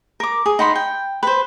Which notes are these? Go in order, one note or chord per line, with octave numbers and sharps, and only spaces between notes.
A#4 D6
G#4
D#4 F#5 B5 C6
G5
B4 C5